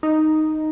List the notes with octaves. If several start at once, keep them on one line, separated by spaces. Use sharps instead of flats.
D#4